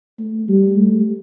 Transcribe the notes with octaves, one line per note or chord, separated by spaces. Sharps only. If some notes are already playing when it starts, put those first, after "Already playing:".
A3
G3
A3